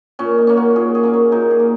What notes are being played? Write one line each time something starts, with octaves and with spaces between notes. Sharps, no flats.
A#2 C#4
D#4
A#3 C#4
F#4
A#2 G#4
G#4
A#3 C#4
C#4
A#2 D#4
G#4
A#3